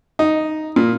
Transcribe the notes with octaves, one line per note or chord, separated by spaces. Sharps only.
D#4
A#2